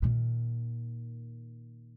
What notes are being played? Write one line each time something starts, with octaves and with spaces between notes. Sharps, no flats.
A#2 D#3